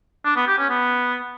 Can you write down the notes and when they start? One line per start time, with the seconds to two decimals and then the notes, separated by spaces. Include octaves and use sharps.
0.25 D4
0.36 B3
0.47 G4
0.58 C#4
0.70 B3